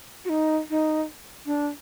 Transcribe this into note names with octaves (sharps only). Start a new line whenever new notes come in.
F#4
D#4
D#4
D4